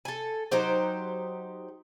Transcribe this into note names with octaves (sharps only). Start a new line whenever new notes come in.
A4 G#5
F#3 D#4 G4 C5